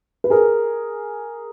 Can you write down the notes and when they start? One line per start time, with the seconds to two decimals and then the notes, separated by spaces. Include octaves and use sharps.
0.24 B4
0.30 G#4 A#4